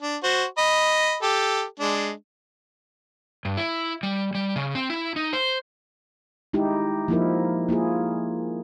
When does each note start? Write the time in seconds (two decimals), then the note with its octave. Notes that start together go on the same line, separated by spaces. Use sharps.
0.02 D4
0.23 F#4 C5
0.58 D#5 B5
1.23 G4 A4
1.80 G#3 D4
3.45 G2
3.57 E4
4.03 G3
4.35 G3
4.56 C#3
4.75 C4
4.90 E4
5.16 D#4
5.33 C5
6.53 G#3 D#4 E4 G4
7.08 F3 A#3 D#4 E4 A#4
7.69 A#3 E4 F4 G#4